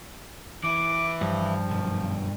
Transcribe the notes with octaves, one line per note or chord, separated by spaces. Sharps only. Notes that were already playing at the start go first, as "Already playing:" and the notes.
E3 E4 D6
G2 F3
B1 F#2